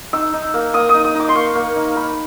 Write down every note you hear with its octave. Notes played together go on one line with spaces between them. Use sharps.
D#4 E6
D#4
A#3
A#3 D#6
D#4 D#6
D#6
D#4
D6
C6
A#3 C#6
A#3
D#4
D#4 B5